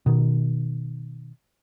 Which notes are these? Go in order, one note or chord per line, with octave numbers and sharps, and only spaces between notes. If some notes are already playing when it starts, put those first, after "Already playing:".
B2 D#3